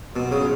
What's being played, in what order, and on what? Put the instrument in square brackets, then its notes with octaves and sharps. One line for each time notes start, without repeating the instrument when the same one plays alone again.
[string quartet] G#2 F#3 B3 F4 [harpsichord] B2
[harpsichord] C#3